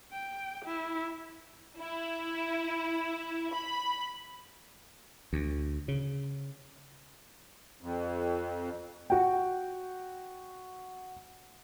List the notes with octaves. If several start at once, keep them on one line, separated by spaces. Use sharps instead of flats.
G5
E4
E4
B5
D2
C#3
F2
F#4 G5